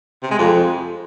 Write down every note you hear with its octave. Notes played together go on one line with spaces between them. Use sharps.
C3
G#3
F2